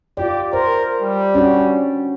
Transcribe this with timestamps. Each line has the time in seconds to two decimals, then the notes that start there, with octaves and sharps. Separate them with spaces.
0.17 F4 G4 D5
0.53 A#4 C5
1.02 G3
1.35 C#4 D4 F#4